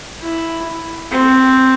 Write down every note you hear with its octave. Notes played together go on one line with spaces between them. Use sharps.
E4
C4